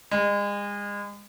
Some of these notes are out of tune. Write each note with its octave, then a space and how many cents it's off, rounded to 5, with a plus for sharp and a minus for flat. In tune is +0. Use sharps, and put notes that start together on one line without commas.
G#3 -35